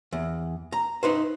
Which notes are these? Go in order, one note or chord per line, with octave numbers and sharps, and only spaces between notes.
E2
A#5
D#4 B4 C5